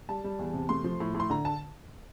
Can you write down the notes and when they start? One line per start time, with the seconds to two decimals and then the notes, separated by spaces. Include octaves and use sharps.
0.09 G3 A5
0.24 G3
0.39 E2
0.54 C3
0.69 A3 C6
0.84 F3
1.00 A2
1.15 A2
1.20 C6
1.30 D3 A#5
1.45 A5